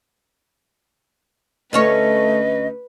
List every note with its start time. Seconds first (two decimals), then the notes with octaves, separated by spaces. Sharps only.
1.73 D2 A3 C#4 B4 C#5 D#5